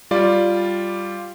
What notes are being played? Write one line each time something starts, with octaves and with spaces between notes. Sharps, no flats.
G3 F4 D5